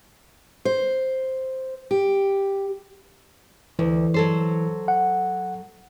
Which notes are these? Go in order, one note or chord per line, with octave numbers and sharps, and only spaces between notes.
C5
G4
D2 E3
F#3 A4 C5
F#5